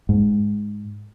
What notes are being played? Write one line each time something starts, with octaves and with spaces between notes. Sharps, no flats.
G#2